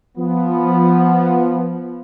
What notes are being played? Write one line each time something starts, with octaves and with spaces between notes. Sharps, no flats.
F3 B3